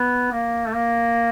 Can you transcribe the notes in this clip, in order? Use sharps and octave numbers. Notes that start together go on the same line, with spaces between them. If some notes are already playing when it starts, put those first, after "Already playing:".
Already playing: B3
A#3
A3
A#3